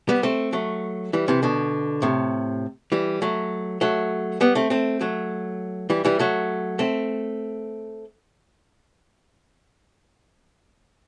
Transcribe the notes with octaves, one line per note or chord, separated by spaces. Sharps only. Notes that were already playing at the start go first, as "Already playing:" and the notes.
G3 B3
A3 C4
F#3 A3
E3 G3
C3 E3
B2 D3
A2 C3
E3 G3
F#3 A3
F#3 A3
G3 B3
A3 C4
A3 C4
F#3 A3
E3 G3
E3 G3
F#3 A3
A3 C4